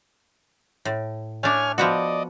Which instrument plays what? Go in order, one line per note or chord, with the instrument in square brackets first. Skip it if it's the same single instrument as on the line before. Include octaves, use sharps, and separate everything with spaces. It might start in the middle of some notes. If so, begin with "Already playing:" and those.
[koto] A2
[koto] A3 D4 [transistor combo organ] C#5 G#5 F6
[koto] F3 B3 F#4 [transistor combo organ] D5 D#5